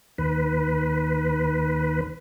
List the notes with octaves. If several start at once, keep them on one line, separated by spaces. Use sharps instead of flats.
D#2 B4